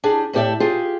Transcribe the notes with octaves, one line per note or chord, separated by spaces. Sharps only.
D4 G4 G#4
A2 A3 B3 G4 D5 E5
F4 G4 G#4